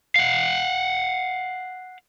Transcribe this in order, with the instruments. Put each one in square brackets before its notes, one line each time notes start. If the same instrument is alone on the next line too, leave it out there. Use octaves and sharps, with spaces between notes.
[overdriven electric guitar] F5 F#5